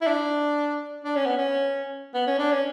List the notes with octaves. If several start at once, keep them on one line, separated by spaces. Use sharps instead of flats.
E4
D4
D4
C#4
B3
C#4
B3
C#4
D4
C#4